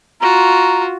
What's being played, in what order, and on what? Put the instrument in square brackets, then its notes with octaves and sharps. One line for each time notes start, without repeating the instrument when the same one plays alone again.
[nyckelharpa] F4 F#4 [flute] A#5